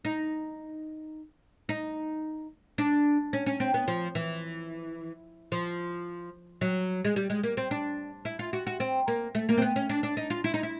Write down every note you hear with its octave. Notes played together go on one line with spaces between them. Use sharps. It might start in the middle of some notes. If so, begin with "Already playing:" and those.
D#4
D#4
D4
C#4
C#4
C4
B3
F3
E3
F3
F#3
G#3
G3
G#3
A#3
C4
D4
E4
F4
F#4
F#4
C4
A#3
A3
A#3
C4
B3
C#4
D4
D4
D#4
F4
E4
D#4
E4